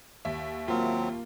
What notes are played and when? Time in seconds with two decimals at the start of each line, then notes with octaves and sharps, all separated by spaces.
0.25 D#2 E5
0.68 F#3 A#3 C4 F4